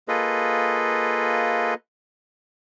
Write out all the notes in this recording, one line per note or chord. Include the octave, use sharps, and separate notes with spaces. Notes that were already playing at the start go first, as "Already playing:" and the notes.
A#3 F4 G#4 A4 B4 D#5